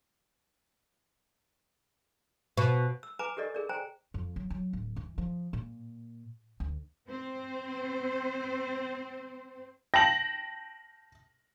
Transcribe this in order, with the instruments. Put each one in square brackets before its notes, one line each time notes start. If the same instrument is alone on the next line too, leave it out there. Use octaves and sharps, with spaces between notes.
[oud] B2
[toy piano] E6
B4 G#5 A#5 D6
G4 A4 A#4 D5 D#5
G#4 A#4 D5
C5 G5 G#5 A#5
[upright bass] F2
F#3
F#3
D1
E3
F3
A#2
D2
[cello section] C4 C5
[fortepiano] G5 A5 [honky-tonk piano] A#6 F#7